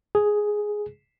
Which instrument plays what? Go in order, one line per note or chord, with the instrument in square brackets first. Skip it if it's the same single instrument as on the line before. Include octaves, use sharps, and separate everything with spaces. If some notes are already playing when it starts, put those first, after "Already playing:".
[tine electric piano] G#4